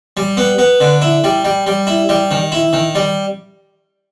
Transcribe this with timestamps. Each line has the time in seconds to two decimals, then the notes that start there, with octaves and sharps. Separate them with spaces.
0.17 G3
0.37 B3
0.58 B3
0.80 D3
1.02 E4
1.24 G3
1.45 G3
1.67 G3
1.87 E4
2.09 G3
2.31 D#3
2.52 E4
2.73 D#3
2.95 G3